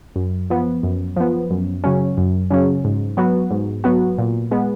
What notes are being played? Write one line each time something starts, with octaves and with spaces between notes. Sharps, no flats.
F#2
F3 B3
F#2
F3 B3
F#2
C#3 F#3 C#4
F#2
C#3 F#3 C#4
G#2
F#3 B3 F#4
G#2
F#3 B3 F#4
A#2
G#3 B3